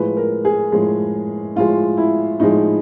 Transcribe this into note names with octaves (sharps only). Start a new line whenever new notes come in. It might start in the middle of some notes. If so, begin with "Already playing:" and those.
Already playing: A2 F3 G#3 B4
A#4
G#4
A2 F3 G#3
A2 F3 G#3 F4
E4
A2 F3 G#3 D#4